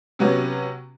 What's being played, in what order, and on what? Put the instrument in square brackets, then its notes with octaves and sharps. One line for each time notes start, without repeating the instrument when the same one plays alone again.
[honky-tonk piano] C3 F#3 B3 C#4